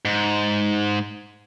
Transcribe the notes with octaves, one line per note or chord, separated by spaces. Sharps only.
G#2